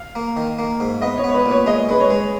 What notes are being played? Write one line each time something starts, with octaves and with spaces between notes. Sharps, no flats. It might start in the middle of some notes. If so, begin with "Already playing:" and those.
Already playing: F5
A#3
D#3
A#3
G#2
B3 D#5
C#5
B3
C#5
B4
A#2
C#5
G#3 D#5
G#3 B4
C#5
G#3